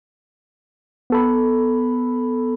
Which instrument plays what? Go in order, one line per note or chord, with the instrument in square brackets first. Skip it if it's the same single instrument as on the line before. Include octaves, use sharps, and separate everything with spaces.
[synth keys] B3 A4 B5